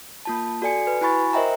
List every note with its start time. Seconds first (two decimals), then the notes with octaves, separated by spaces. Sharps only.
0.25 A#3 F4 A5
0.62 F#4 A4 D5 G#5 C#7
0.87 B4
1.01 E4 F#4 G#5 B5 C#6 A6
1.33 A#4 C5 D#5 E5 G5 A#5